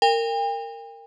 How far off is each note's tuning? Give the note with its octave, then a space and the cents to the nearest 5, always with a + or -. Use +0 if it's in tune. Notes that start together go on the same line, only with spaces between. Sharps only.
A#4 -20 G5 +40